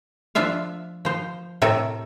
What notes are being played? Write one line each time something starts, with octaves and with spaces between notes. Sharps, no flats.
F3 D4 F4 E5 F5
F3 C5
A2 C3 A4 A#4 E5